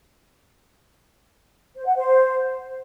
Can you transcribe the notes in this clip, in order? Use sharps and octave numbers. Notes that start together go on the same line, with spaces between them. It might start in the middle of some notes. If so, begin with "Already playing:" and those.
C5
F#5
C5